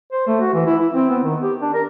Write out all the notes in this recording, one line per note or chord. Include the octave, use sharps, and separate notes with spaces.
C5
A3
F#4
E3
E4
E4
C4
B3
D#3
G4
D4
A#4